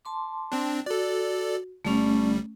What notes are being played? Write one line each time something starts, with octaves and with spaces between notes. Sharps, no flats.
A5 C6 D6
C4 D4
F#4 A4 D5
G1 G3 A3 C#4